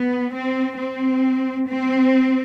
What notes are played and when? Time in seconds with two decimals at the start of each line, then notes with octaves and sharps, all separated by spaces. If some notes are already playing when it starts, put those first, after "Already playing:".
Already playing: B3
0.34 C4
0.77 C4
1.66 C4